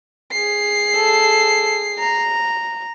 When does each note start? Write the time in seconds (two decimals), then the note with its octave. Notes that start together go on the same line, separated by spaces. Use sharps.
0.32 G#4 C7
0.96 A4
1.99 A#5